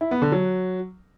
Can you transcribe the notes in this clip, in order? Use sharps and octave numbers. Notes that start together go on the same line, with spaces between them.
E4
B3
D3
F#3